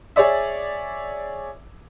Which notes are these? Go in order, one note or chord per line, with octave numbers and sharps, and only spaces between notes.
G#4 C#5 D5 E5